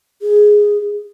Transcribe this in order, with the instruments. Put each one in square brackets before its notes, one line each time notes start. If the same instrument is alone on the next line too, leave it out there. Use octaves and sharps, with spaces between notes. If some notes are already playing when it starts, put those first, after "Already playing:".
[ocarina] G#4